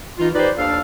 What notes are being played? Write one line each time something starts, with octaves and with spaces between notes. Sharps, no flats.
E3 D#4 F4
D#4 G4 B4 C5 D5
D#2 D4 A4 F5